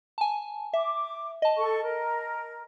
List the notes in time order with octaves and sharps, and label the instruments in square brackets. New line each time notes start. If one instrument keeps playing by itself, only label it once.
[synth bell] G#5 A5
[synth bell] E5 [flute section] D6
[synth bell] D#5 A5
[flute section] A4 C#6
A#4